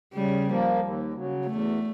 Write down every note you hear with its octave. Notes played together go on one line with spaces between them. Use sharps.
C#3 G3
F3 A#3
D#2
C#3 F#3
E2 A3